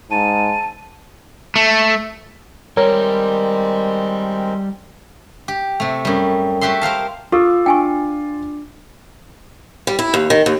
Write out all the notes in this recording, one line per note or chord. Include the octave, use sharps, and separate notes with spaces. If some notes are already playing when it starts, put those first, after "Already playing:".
G#2 A5 D#7
A3
D#3 G3 G#3 C4 A#4 C#5
G4
C3 A3
F#2 G3
A3 F#4 G4 E5 C6
A#4 C5 F5 A5
F4 A4 C#6 D6 E6
D4 G5 G#5 C#6 D6
G3
E4
D#2
D#3
D#2